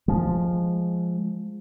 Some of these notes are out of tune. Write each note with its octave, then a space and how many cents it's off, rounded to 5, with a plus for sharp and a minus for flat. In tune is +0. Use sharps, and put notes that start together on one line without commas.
F3 +0 G#3 +0